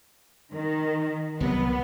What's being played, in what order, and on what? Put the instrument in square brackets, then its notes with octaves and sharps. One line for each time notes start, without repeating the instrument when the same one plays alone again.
[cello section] D#3
[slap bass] C2 C3 F#3 [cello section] B3